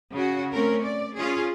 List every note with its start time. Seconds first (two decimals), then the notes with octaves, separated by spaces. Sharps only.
0.12 C#3 F#4
0.53 A3 C4 C#4 A#4
0.83 D5
1.17 C#4 F4 G#4